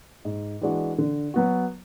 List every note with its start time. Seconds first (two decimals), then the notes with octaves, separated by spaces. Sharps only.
0.25 G#2
0.61 E3 G#3 D4 F#4
0.98 D3
1.34 F#3 B3 F#4